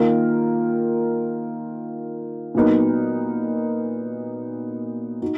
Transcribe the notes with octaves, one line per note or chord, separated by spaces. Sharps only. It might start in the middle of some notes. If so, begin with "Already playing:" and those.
Already playing: D#3 A#3 F4 A#4
A#2 F#3 B3 D#4 A#4
D#4 F#4